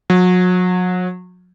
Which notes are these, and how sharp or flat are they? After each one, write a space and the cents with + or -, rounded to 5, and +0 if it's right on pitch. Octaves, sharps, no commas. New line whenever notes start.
F#3 -35